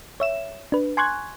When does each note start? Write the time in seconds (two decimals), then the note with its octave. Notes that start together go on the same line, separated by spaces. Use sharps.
0.20 C#5 E5 E7
0.72 D4 B4
0.97 G#5 C6 C#6 F#6 G#6